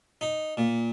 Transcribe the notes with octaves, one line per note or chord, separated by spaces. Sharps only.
D#4
A#2